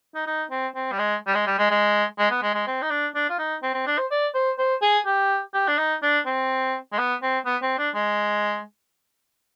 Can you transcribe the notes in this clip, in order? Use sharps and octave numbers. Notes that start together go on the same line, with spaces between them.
D#4
D#4
C4
C4
G3
G#3
G3
G#3
G3
G#3
G#3
G#3
B3
G#3
G#3
C4
D#4
D4
D4
F4
D#4
C4
C4
D4
C5
D5
C5
C5
G#4
G4
G4
D4
D#4
D4
C4
G#3
B3
C4
B3
C4
D4
G#3